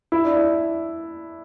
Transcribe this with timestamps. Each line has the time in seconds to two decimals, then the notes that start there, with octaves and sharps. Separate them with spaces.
0.12 E4
0.25 D4
0.36 E4